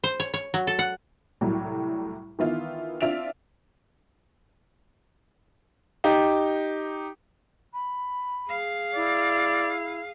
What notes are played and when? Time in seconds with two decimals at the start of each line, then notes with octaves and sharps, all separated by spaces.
0.04 C5
0.20 C#5
0.34 C#5
0.54 F#3
0.67 A4
0.79 F#5
1.41 C2 A2 F#3 G3
2.39 D#3 E3 B3 E4 F4
3.01 C4 D4 F4 E5 D7 F7
6.04 D#4 G4
7.73 B5
8.48 G#4 F5
8.95 E4 D5